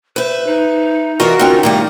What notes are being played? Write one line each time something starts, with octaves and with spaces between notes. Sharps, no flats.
B4 C5 E5
D#4
E3 F4 F#4 A#4 D#5 E5
D3 C4 C#4 D#4
A2 D#3 G3 A#3